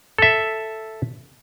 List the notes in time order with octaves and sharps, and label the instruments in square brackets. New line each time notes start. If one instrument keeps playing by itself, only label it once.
[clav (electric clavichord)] A4 E5